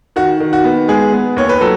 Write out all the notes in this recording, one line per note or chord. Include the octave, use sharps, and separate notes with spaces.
D#3 F#4
D#3
F#4
B3
G#3 G#4
B3
D#2 C#5
B4
F#3 A4